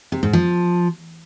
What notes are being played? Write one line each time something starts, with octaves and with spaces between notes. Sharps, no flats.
C3
G#2
F3